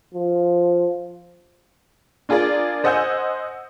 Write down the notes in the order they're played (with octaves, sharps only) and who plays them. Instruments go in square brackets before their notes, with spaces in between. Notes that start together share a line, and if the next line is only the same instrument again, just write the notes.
[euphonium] F3
[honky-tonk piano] D4 F4 G#4 A#4 D5
C5 D#5 F#5 G#5 E6 G6